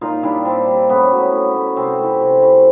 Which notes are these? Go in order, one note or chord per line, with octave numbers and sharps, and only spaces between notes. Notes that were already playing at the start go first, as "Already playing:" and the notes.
A#2 D#4 F4
G3 D4 E4
A#2 C4 D4
G3
A2 B3 C#4
F#3 A3
A2
F#3 A3
C3 C4
E3 A3
C3
E3 A3